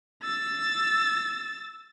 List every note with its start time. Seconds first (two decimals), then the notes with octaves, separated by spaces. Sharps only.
0.24 E6 A6